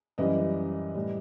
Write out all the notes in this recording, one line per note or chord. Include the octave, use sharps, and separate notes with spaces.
F#2 E3 G3 B4 D#5
A2 G3